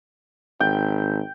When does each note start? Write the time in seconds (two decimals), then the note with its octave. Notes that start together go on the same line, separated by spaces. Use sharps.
0.60 G#1 G5